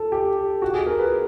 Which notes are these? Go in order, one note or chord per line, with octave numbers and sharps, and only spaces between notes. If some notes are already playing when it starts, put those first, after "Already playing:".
Already playing: A4
G4
F#4
G#4
A#4
B4